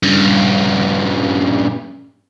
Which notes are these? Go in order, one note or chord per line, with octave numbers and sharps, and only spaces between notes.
G2 C#3